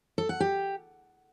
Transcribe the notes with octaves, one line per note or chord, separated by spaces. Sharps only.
A4
F#5
G4